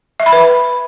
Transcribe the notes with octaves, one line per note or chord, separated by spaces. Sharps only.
E5
B5
B4